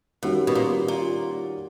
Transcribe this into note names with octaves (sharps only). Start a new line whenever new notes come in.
A2 D#3 G3 A#3 C#4 F#4
B2
A#2
A#2